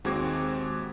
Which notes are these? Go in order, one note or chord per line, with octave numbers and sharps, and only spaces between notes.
D#2 G#3 C4 F#4 D6 G#6